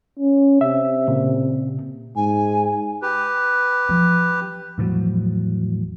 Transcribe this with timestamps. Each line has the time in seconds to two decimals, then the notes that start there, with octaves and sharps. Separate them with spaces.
0.19 C#4
0.61 C3 E5
1.08 A#2 C#3
2.16 G#2 G#5
3.02 G4 B4
3.89 F3
4.78 E2 A2 F3 F#3